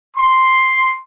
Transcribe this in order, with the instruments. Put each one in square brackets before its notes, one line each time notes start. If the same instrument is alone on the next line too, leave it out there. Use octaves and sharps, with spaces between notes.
[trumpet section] C6